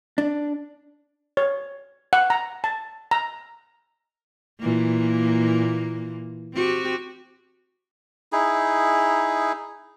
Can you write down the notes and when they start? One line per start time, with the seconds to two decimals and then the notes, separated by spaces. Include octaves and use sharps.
0.18 D4
1.37 C#5
2.13 F#5
2.30 A#5
2.64 A5
3.11 A#5
4.60 A#2 E3 A#3
6.53 C4 F#4 G4
8.32 D#4 E4 G#4